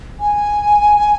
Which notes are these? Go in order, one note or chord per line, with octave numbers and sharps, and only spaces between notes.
G#5